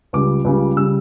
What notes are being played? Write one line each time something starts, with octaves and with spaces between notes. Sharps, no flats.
C#2 C#3 G3 D6
C#2 C#3 G3
C#3 G3 E6